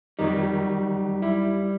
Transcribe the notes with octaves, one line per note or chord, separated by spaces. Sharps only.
F2 D#3 F#3 G3 D#4
G3 E4